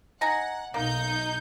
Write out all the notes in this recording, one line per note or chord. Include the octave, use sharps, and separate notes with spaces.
D#4 F#5 G#5 A#5
B1 A#3 D#4 G6